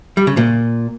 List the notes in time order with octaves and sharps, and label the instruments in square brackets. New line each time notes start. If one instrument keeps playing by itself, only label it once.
[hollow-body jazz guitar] G3
C#3
A#2